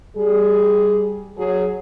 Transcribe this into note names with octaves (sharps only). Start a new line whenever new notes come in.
G3 G#4
F#3 G#4